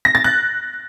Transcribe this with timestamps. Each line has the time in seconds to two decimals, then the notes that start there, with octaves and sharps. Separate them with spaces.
0.05 A#6
0.15 A6
0.24 F#6